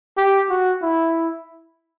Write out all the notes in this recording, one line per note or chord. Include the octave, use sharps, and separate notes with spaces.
G4
F#4
E4